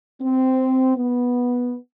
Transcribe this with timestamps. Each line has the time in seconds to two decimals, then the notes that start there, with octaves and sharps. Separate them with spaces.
0.20 C4
0.96 B3